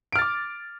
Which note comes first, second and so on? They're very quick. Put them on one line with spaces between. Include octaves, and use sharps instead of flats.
D7 F6 A6 D6